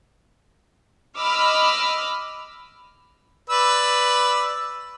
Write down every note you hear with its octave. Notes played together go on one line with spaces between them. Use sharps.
D#5 B5 D6 E6 F6
B4 D5 E6